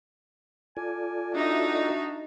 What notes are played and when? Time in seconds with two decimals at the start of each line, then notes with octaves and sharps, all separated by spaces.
0.77 F4 A4 D5 G#5
1.34 D4 D#4 F#4 E5